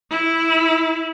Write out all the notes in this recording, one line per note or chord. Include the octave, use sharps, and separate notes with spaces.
E4